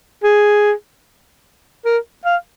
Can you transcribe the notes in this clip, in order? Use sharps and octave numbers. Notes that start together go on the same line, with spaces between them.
G#4
A#4
F5